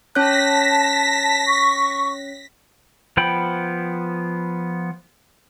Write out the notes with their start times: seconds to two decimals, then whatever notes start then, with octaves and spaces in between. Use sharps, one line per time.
0.15 C#4 C#5 A5 F#6 A#6 B6
1.46 C#6
3.17 F3 B3 C5 G5 B5